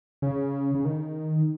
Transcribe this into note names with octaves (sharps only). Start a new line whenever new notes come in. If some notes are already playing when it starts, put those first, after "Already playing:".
C#3
C#3
D#3